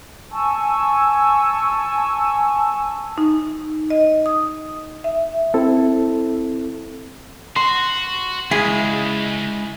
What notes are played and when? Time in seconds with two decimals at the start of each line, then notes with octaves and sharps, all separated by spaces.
0.32 G#5 A5 C#6 E6
3.18 D#4
3.90 D#5
4.26 D#6
5.04 E5
5.54 C4 E4 A4
7.56 F#4 C6
8.51 C#2 G#3 E4 G#4